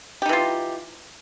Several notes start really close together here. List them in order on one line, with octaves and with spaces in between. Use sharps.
G4 D#4 E3 F4